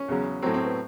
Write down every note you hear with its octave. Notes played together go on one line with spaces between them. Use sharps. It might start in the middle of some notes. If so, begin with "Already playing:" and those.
Already playing: C#4
E2 C#3 F#3
A2 F#3 C4
C4
B3